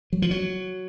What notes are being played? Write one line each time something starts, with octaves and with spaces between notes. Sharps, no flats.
F#3
F3
F#3